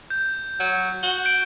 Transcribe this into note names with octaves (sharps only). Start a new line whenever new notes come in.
G6
F#3
F#4 G7
G6 D7